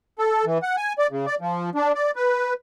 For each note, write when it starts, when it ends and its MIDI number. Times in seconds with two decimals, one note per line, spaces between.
0.19 0.45 69
0.46 0.58 52
0.62 0.76 78
0.77 0.93 80
0.98 1.07 74
1.11 1.26 49
1.27 1.35 74
1.41 1.70 53
1.75 1.93 62
1.95 2.11 74
2.16 2.54 71